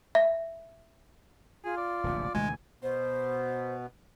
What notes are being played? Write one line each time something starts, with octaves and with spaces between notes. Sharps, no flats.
E5
F4 G#4
D5
D1 A#1 C3
D2 B2 E3 G#3 G#5
B2 B3 C5